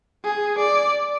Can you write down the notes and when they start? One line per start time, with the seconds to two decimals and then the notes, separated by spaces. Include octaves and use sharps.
0.24 G#4
0.59 D5